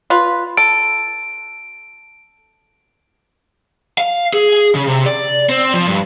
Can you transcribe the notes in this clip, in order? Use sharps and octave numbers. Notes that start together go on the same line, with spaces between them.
F4 B4
A4 D7
F5
G#4
C#3
C3
D5
C4
F3
G2